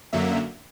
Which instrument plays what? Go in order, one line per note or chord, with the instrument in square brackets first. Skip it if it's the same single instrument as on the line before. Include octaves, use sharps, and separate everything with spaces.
[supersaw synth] F#2 D3 F#3 A#3 E5